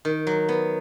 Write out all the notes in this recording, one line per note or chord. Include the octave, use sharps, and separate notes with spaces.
D#3
F#3
B3